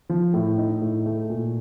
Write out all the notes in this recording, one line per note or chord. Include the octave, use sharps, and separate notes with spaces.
F3
A2
D#4
A2
A3
A#2